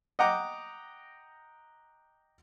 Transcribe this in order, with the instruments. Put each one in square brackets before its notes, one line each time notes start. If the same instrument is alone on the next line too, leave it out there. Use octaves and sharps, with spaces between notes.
[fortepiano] D#5 F#5 G5 A#5 D6 D#6